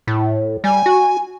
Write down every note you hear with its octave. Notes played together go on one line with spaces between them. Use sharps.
A2
G3 G#5
F#4